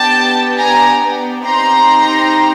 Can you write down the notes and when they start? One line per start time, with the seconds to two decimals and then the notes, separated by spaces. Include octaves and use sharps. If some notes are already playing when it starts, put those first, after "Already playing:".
Already playing: B3 D4 G4 G5 A5
0.58 G#5 A#5
1.44 C4 D#4 G4 A#5 C6